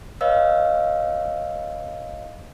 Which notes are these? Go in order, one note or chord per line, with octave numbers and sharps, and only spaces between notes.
B4 C#5 D#5 F5 E6